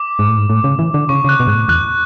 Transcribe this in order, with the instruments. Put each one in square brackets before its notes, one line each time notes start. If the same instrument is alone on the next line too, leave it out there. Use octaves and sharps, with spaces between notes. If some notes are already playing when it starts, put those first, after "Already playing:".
Already playing: [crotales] D6
[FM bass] G#2
A2
G#2
A2
C#3
E3
D3
[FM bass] C#3 [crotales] C#6
[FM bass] C#3 [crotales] F#6
[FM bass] B2
[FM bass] G#2 [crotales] F#6
[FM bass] A2
[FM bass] E2 [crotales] F#6